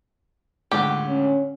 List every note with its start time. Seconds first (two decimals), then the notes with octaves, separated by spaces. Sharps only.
0.71 C#2 A2 D3 G4
1.07 C#4